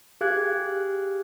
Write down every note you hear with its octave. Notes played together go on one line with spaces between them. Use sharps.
G4 G#4 F5 F#6 G#6